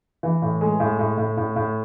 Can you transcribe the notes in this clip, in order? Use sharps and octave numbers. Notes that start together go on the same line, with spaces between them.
E3
A2
G#3
A2
A2
A2
A2
A2